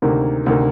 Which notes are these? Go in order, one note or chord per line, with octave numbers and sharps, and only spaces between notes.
D2 C3 D#3 A#3
D2 C3 D#3 A#3